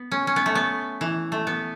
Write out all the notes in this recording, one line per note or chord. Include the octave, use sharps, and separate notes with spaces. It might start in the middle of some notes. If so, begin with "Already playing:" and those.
Already playing: B3
C#4
C#4
B3
A3
B3
E3
A3
B3